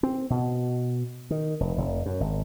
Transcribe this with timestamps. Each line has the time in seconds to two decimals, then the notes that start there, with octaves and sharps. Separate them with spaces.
0.03 C4
0.30 B2
1.30 D#3
1.60 F1
1.78 F1
2.06 F#2
2.20 G#1